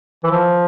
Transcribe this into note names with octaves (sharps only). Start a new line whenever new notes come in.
E3
F3